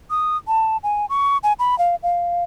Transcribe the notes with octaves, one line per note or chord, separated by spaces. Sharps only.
D#6
A5
G#5
C#6
G#5
B5
F5
F5